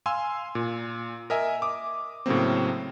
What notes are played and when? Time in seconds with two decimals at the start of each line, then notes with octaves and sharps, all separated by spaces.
0.06 F5 G#5 C6 E6
0.55 A#2
1.30 A#4 D#5 E5 G#5
1.62 D6 D#6
2.26 A2 C#3 F#3 A#3 C4